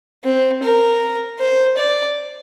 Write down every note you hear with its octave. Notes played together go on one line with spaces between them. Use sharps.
C4
A#4
C5
D5